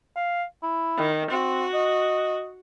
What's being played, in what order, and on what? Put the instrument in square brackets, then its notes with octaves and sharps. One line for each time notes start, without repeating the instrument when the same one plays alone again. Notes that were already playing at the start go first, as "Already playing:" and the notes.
[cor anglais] F5
E4
[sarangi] D#3
[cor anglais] C4 [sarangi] F#4
[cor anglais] D#5